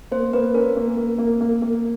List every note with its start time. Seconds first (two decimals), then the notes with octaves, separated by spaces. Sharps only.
0.11 A#3 C5
0.33 A#3 B4
0.54 C#4 A#4
0.76 A#3
0.97 A#3
1.18 A#3
1.41 A#3
1.62 A#3